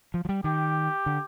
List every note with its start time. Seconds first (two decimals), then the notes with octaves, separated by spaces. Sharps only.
0.14 F3
0.25 F3
0.29 G3
0.44 D#3 G4
1.06 D3